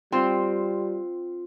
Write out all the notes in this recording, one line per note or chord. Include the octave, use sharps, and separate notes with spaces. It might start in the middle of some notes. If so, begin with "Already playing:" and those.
G3 C4 F4